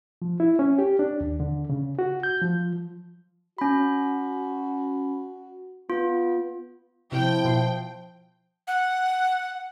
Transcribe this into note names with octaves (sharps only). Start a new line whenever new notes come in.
F3
E4
C#4
G4
D4
D#2
D3
C#3
F#4
G6
F3
C#4 F#4 B5
B3 F4
C3 F3 E4 G5
B2 F4 C7
F#5